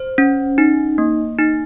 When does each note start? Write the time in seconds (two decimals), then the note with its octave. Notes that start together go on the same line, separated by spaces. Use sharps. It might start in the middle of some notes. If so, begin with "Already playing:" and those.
Already playing: C5
0.18 C#4
0.58 D#4
0.98 A#3
1.39 D#4